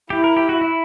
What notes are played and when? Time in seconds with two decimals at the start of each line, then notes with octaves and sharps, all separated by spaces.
0.10 E4 G4
0.24 A#4
0.37 G4
0.49 F#4
0.61 E4